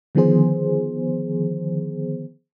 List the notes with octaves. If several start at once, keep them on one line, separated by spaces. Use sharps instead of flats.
D3 D#3 F3 B3 G#4 C5